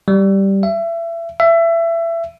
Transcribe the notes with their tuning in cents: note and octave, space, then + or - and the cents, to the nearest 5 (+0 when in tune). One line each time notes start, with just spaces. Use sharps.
G3 -5
E5 +30
E5 +25